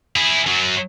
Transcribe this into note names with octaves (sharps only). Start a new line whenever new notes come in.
E4 G#4
F#2 F#3